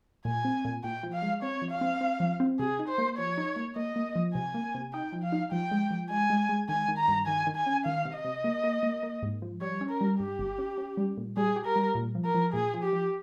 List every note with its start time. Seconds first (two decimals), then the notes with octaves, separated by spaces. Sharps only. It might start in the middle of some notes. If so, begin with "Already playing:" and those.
0.25 A#2 G#5
0.45 C4
0.65 A#2
0.84 A#2 G5
1.03 F3
1.13 F5
1.22 G#3
1.42 C4 C#5
1.62 F3
1.71 F5
1.81 C4
2.01 C4
2.20 F3
2.40 C4
2.59 C3 G#4
2.79 D#4
2.88 C5
2.98 A#3
3.17 F3 C#5
3.38 D#4
3.56 A#3
3.76 A#3 D#5
3.96 A#3
4.16 F3
4.34 C3 G#5
4.54 A#3
4.74 C3
4.93 D#4 G5
5.12 F3
5.23 F5
5.32 D#4
5.52 F3 G5
5.71 G#3
5.91 F3
6.10 G#3 G#5
6.30 G#3
6.49 G#3
6.69 D#3 G#5
6.88 D#3
6.98 A#5
7.08 G2
7.27 D#3 G#5
7.47 D#3
7.56 G#5
7.66 C#4
7.85 D#3 F5
8.05 C3
8.14 D#5
8.25 C3
8.44 A#3
8.64 A#3
8.83 A#3
9.03 A#3
9.22 G#2
9.42 F3
9.61 G3 C#5
9.81 C#4
9.90 A#4
10.01 G3
10.19 G2 G4
10.39 G1
10.58 C#4
10.78 C#4
10.97 G3
11.17 A#2
11.37 G3 G#4
11.56 G4
11.66 A#4
11.76 G3
11.95 A#2
12.15 F3
12.25 A#4
12.34 F3
12.54 A#2 G#4
12.74 F3
12.83 G4
12.93 F3